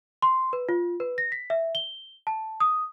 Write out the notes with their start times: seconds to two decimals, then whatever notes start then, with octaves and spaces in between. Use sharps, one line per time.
0.22 C6
0.53 B4
0.69 F4
1.00 B4
1.18 A#6
1.32 B6
1.50 E5
1.75 G7
2.27 A5
2.60 D#6